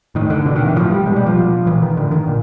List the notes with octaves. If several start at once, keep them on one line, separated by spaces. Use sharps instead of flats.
A2 D#3
D3
B2 D3
D#3
E3
A2 F3
G3
B2 G#3
G3
F3
B2
A#2 E3
D#3
A2 D3
D#3
A#2